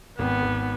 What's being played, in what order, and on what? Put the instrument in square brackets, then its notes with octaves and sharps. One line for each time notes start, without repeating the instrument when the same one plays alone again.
[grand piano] G#1 [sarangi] B3
[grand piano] G#1